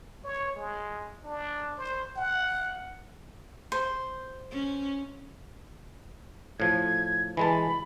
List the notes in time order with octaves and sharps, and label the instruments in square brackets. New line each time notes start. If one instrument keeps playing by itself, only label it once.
[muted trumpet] C#5
G#3
D4
C5
F#5
[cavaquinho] C5
[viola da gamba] C#4
[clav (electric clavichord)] A2 F3 [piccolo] G#6
[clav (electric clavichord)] E3 G#3 A5 [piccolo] B5